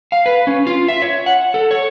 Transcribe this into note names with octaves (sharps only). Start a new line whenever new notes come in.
F5
B4
C#4
F4
E5
C#5
F#5
A4
C#5